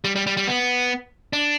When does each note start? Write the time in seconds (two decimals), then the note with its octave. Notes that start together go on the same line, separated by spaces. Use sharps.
0.05 G3
0.16 G3
0.27 G3
0.37 G3
0.47 B3
1.33 D4